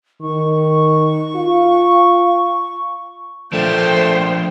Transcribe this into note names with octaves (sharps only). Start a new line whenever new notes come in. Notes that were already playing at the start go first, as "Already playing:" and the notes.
D#3 C#6
F4
F3 A3 D4 C5 G5